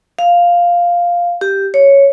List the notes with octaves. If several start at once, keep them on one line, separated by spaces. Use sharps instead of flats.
F5
G4
C#5